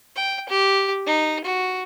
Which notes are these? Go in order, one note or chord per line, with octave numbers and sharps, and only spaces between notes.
G5
G4
D#4
F#4